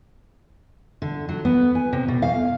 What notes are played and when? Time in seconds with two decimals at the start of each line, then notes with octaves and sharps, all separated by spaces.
1.02 D3
1.29 F#3
1.45 B3
1.75 G#5
1.93 C3
2.08 B2
2.22 F5